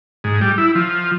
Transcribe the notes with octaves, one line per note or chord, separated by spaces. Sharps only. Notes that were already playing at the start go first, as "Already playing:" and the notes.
G#2
G3
E4
F3